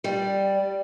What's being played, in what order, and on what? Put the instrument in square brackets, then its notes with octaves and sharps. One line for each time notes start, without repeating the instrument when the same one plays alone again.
[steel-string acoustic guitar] G3 [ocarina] D5